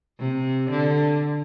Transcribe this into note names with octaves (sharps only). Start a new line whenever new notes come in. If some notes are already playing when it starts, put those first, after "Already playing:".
C3
D3